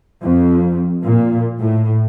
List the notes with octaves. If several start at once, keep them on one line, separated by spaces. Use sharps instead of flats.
F2
A#2
A2